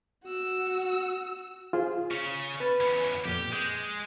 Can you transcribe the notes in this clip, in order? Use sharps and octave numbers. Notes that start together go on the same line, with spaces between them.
F#4 E6
F4 G#4 C5
C#3 C#4 C#6
B4 B5 A6
E2 C#4
F2 A#2 G4
G#3 G6